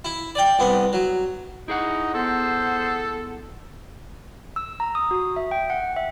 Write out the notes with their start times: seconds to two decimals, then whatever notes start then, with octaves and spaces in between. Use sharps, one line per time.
0.05 E4
0.35 D5 G5
0.59 C2 B3
0.93 F#3
1.68 D#4 E4 G#4 F#5
2.14 B3 A4 C5
4.56 E6
4.80 A#5
4.95 D#6
5.11 F#4
5.36 E5
5.51 G5
5.70 F#5
5.96 E5